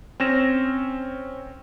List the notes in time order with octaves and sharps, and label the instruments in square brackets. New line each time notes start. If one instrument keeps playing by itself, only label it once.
[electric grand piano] C4 C#4 A#6 E7